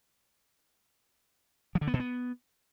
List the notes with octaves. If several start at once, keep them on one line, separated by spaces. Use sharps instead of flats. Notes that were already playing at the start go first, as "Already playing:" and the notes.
F3
D3
B3
B2
B3